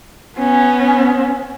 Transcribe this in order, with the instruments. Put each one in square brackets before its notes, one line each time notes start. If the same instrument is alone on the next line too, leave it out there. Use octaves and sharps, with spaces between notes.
[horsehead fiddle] B3 C#4